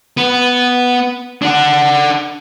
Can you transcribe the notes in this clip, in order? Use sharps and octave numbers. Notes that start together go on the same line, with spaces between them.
B3
D4 F#5